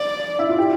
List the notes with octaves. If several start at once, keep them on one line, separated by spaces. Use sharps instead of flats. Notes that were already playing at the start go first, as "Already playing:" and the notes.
Already playing: D5
E4
F4
G4